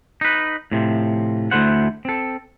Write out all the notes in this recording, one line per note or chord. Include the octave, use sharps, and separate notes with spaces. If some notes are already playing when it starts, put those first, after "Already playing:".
D#4 B4
A2 C3 F3
D2 G#3 A3 E4 C5 F#5
C4 A4